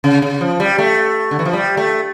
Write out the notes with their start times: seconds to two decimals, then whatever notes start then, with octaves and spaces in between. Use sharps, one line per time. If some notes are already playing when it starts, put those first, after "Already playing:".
0.04 C#3
0.22 C#3
0.41 F3
0.60 G3
0.78 A3
1.31 D3
1.39 E3
1.45 F3
1.53 G3
1.77 A3